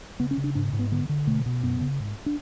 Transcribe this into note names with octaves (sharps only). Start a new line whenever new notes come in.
C#3 B3
C#4
C#3
D4
G#2 D4
G#2
B3
D3 B3
D3
B2 A3
B2
F#2 B3
C#3
G#2
D4